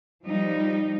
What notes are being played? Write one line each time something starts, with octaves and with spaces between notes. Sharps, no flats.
F3 G3 D#4